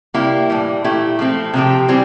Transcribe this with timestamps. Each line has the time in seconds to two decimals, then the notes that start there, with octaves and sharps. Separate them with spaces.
0.14 C3 G3 A#3 E4 G4
0.49 A2 E3 G3
0.84 A#2 A3 E4 G4
1.19 F3 A3 C4 E4
1.54 C3 F3 C4 G4
1.88 E3 G3 C4 G4